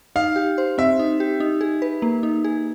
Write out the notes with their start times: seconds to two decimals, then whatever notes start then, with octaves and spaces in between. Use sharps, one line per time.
0.16 D#4 F5
0.36 G4
0.58 C5
0.78 C4 E5
0.99 D#4
1.20 G4
1.40 D#4
1.61 G#4
1.82 B4
2.02 A#3
2.23 D#4
2.44 G#4